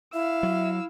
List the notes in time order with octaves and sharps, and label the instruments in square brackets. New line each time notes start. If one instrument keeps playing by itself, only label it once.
[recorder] E4 [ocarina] E5 [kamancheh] F5 E6
[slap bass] F#3